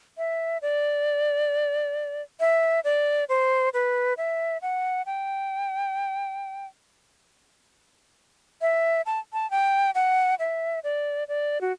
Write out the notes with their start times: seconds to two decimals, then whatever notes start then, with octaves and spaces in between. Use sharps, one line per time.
0.18 E5
0.62 D5
2.40 E5
2.84 D5
3.29 C5
3.74 B4
4.18 E5
4.62 F#5
5.06 G5
8.62 E5
9.06 A5
9.33 A5
9.51 G5
9.95 F#5
10.39 E5
10.84 D5
11.28 D5
11.61 F#4